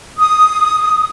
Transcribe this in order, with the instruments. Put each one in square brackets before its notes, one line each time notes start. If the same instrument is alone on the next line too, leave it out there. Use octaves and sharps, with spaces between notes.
[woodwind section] D#6